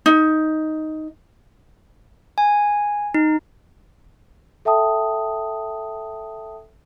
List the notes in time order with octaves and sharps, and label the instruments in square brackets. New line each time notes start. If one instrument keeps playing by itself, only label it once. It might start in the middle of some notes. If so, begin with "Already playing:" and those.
[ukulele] D#4
[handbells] G#5
D#4
[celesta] A4 E5 G5 A5 D#6